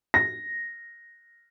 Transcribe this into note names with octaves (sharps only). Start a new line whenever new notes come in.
A#6